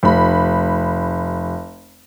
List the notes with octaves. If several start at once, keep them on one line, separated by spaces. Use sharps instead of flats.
F1 B5